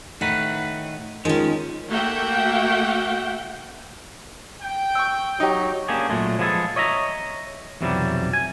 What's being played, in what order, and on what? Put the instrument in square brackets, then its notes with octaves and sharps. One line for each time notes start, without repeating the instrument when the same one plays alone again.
[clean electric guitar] A2 D#3 B4 [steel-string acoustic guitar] F#5
[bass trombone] D#3 [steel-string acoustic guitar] F3 C#4 [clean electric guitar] G#3
[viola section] A3 A#3 F#4 E5 F#5 G5
[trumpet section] G5
[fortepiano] C#6 E6
[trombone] F#3 [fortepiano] D#4 G4
[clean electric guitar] A#3 C#4 D4 G4 G#4
A#2 F#3 G#3 A3
F3 G#3 B3 G#4 A4
C#5 D#5 E5 A#5
B1 F2 C3 E3 F#3 G3
G#5